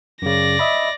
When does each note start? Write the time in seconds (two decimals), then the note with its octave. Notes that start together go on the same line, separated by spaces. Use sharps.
0.22 F#2 C#3 D5 A#6
0.59 D#5 E5 B5